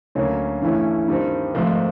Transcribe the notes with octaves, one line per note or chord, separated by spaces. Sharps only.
D2 D3 F#3 A#3 C#4
G2 E3 A3 C#4 E4
G2 D#3 G3 C4 D#4
G#1 G#2 F3 A3 C4